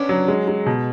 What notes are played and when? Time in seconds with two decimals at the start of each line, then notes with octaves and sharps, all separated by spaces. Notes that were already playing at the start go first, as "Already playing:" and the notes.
Already playing: B3 C#4 D4
0.09 F#3
0.28 G#3
0.48 G#3
0.66 B2